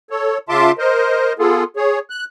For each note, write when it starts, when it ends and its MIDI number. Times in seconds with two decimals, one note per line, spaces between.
0.10 0.38 69
0.10 0.38 73
0.49 0.72 49
0.49 0.72 65
0.49 0.72 76
0.49 0.72 81
0.49 0.72 84
0.49 0.72 86
0.78 1.33 70
0.78 1.33 72
0.78 1.33 75
1.39 1.64 59
1.39 1.64 65
1.39 1.64 68
1.39 1.64 69
1.76 1.99 68
1.76 1.99 73
2.10 2.25 90